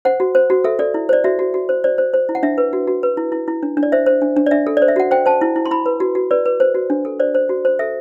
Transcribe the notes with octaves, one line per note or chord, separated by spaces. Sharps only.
C5 F#5
F#4
C5
F#4
A4 E5
A4 D5
E4
C5 D5
F#4 E5
F#4
F#4
C5
C5 D5
C5
C5
E4
F#5
D4 E5
B4
F#4
F#4
B4
E4
E4
E4
D4
D4
D5
C5 E5
C5
D4
D4
D5
D4 E5
A4
D5
C5
E5
F#4 F#5
C5 G5
C5 A5
E4
E4
C6
E4 B5
B4
F#4
F#4
B4 D5
B4
C5
F#4
D4
A4
C5 D5
C5
F#4
C5
A4 E5